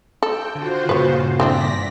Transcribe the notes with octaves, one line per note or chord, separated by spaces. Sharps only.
A4 G5
D3 F4 F#4 C5
G2 A#2 C#3 B4 C#5
E3 C4 D4 D5 A#6 B6